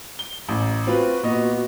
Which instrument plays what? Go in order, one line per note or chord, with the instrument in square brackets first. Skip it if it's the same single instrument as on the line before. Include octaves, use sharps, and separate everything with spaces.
[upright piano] G7
A1
[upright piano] C4 F4 B4 [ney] F#4
[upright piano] A#2 B3 D#5